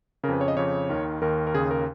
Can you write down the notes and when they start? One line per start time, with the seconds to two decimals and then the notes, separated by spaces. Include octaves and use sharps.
0.24 C#3 A#4
0.28 F2 B4
0.41 C#5
0.48 D#5
0.57 F2 C#3 C#5
0.89 D#2 D#3
1.22 D#2 D#3 A#4
1.47 A#4
1.54 D#2 C#3 G#4
1.71 A#4